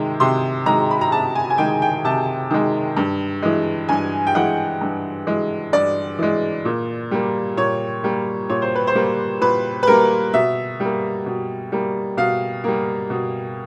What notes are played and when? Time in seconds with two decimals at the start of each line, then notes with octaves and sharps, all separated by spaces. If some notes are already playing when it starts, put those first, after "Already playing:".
Already playing: C3 D#3 G#3
0.20 C3 C6
0.66 D#3 G#3 A#5
0.91 B5
1.01 A#5
1.12 C3 A5
1.35 G#5
1.50 G#5
1.58 D#3 G#3 G5
1.82 G5
2.04 C3 A5
2.51 D#3 G#3
2.97 G2
3.42 E3 G#3
3.89 G2 G#5
4.27 G5
4.35 E3 G#3 F#5
4.81 G2
5.27 E3 G#3
5.73 G2 D5
6.19 E3 G#3
6.65 A#2
7.11 G3 A#3
7.57 A#2 C#5
8.03 G3 A#3
8.49 A#2 C#5
8.62 C5
8.75 B4
8.87 C5
8.95 G3 A#3
9.41 A#2 B4
9.83 B4
9.87 G3 A#3 A#4
10.34 B2 E5
10.80 G3 A#3
11.26 B2
11.72 G3 A#3
12.17 B2 F5
12.64 G3 A#3
13.10 B2